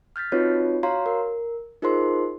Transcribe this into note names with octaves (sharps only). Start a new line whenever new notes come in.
F6 G6 A6 B6
C4 D#4 F4 F#4 B4 C#5
F#4 C#5 F5 A#5 C6
A#4
D#4 F4 G#4 A#4 C5 C6